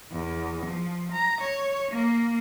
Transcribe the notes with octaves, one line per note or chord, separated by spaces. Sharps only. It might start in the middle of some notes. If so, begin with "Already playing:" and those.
E2
F3
A#5
C#5
A#3